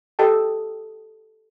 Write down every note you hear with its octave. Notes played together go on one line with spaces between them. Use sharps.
G4 A4 D#5 G5 A5